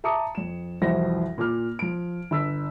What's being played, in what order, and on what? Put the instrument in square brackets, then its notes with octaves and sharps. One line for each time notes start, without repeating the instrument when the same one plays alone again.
[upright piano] E5 A5 A#5 D6 D#6 C#7
F2 E7
C2 F2 E3 F#4 C5 A#6
A#2 D6 F6
F3 D7
G1 E6 B6